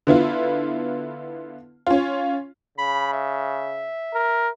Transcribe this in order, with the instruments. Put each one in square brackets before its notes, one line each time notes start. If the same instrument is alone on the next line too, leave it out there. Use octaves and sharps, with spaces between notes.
[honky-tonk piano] D3 B3 E4 F4
C#4 F4
[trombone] C#3 [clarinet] B5
[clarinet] E5
[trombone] A#4